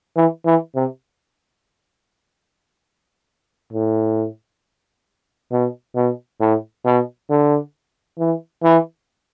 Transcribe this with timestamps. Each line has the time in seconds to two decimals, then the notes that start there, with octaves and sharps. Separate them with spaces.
0.17 E3
0.46 E3
0.76 C3
3.73 A2
5.52 B2
5.96 B2
6.41 A2
6.85 B2
7.30 D3
8.19 E3
8.64 E3